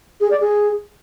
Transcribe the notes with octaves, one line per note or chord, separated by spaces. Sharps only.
G#4
D5
G#4